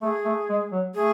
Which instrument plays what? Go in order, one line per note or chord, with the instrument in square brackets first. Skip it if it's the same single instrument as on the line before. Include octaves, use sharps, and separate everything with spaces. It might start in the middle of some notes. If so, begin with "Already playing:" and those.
[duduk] A3 [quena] G#4
[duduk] A3
G#3
F#3
[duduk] A3 [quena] G#4